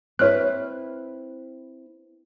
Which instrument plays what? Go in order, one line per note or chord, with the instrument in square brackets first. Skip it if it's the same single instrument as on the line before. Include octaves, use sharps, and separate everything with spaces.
[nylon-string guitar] C4 E4 B4 [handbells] C#5 F6 F#6